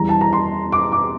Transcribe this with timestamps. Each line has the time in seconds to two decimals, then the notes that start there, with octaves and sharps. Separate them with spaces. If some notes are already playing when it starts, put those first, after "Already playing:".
Already playing: E2 E3 G3 A#5
0.09 A5
0.21 A#5
0.33 C6
0.72 D6
0.92 D6